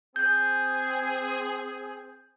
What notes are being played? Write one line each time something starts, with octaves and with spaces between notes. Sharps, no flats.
C4 G#4 G6